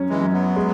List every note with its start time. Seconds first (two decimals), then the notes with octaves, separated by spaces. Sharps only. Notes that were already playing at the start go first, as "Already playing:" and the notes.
Already playing: F#2 C#4
0.10 E3 G#3
0.21 F#2
0.33 F#3 B3
0.56 G#3